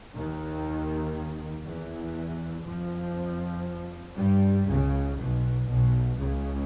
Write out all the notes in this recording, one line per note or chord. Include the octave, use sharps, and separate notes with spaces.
D#2 D#3
E2 E3
F2 F3
G2 G3
C#2 C#3
B1 B2
B1 B2
C#2 C#3